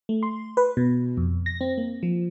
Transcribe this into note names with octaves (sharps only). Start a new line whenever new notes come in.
A3
C6
B4
B2
F2
A#6
C4
A#3
F3